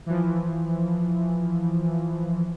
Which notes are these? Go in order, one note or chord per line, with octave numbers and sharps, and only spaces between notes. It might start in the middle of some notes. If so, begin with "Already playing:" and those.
E3 F3